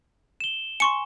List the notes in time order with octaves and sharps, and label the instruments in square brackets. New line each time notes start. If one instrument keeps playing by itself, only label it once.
[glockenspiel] E7 G7
[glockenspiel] G#5 [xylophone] C6 C#6 C#7